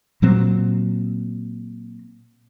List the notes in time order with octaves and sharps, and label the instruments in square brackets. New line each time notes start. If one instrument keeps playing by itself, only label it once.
[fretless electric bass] A#2 F#3 C4